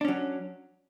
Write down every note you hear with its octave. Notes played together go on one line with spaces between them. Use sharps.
F#3 C#4 D4